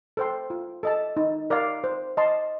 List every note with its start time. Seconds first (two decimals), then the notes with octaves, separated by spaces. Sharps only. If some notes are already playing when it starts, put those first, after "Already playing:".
0.17 A4 C5 G5 C6
0.50 F4
0.83 A4 D#5 A5
1.17 D#4
1.50 A#4 D5 F5
1.84 C5
2.17 D#5 A5 C6